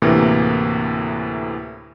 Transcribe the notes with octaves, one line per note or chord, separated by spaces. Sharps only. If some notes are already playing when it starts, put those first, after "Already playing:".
D2 A2 C3 E3 A#3